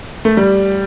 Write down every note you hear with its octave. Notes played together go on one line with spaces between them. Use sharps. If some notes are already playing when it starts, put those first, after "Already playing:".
A3
G3